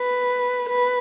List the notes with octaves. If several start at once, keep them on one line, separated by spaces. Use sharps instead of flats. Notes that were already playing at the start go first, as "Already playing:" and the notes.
Already playing: B4
B4